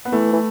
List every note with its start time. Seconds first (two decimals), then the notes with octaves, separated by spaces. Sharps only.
0.05 B3
0.13 E3 A3
0.33 E3